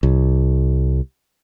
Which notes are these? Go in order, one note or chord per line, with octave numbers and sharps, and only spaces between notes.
C2